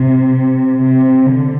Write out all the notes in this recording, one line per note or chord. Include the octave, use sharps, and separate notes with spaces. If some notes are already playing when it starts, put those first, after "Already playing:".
Already playing: C3
C3
D3